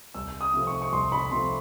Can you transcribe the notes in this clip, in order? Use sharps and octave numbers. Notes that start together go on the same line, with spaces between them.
C2 E6
D#6
C3 F3 A3 C4
C#6
C#6
C2 C6
B5
C3 F3 A3 C4 C6